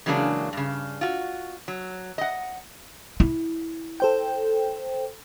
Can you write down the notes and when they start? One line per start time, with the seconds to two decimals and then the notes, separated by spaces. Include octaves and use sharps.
0.06 C#3 E3 F#3 G#3 A#3 D4
0.53 G2 C#3
1.01 F4 F#4
1.68 F#3
2.18 D#5 F#5
3.20 E4
4.00 A4 C5 G5